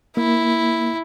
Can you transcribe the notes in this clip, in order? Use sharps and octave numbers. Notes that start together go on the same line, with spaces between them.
A#3 E4